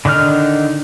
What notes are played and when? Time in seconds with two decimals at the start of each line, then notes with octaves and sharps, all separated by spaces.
0.05 D3 D#3 D4 D#4 F6